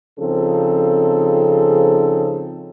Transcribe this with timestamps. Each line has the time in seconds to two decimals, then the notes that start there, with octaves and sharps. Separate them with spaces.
0.20 C#3 F3 C4 D#4 G#4 A4